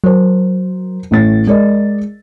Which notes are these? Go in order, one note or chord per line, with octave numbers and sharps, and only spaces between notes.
F#3 A#4 C5
A1 A2 A6
G#3 A#4 D5 D#5